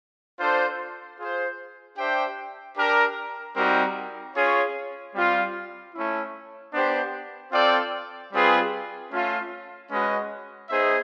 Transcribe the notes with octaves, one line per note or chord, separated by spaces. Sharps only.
D4 F4 A4 C5
F4 G#4 C5
D4 G4 C5 E5 G5
D4 G4 A#4
G3 C4 D#4 F#4 A#4
C#4 F4 G#4 C#5
G3 C4 F4
A3 C#4 E4
B3 D4 G4 C5
C4 F4 A4 D5 G5
G3 C4 F4 G#4 B4
A3 C#4 F4
G#3 C#4 F#4 B4 D#5
B3 D#4 G#4 C5 E5